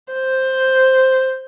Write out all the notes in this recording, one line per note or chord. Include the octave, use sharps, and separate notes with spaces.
C5